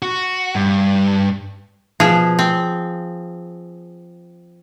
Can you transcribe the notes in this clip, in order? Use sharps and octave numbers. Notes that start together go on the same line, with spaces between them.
F#4
G2
B2 F3 G#4
C4